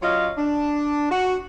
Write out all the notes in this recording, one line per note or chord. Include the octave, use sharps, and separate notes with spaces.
F#3 C#4 F4 C#5 D#5 F5
D4
F#4